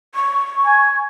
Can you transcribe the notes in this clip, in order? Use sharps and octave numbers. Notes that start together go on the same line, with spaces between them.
C#6
G#5